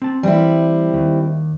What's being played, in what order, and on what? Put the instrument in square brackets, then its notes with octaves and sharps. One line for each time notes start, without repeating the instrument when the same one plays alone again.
[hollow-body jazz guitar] C4 A5
[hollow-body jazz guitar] E3 [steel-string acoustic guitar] G3 C4 E4
[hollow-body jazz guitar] D#2